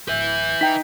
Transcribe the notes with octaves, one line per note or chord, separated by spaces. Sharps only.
D1 B4 E5 G6
D#4 G5 B6